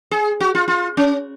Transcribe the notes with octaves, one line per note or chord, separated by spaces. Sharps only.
G#4
F#4
F4
F4
C#4